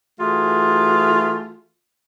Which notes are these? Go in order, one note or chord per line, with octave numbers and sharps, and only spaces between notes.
E3 A3 F4 F#4 G#4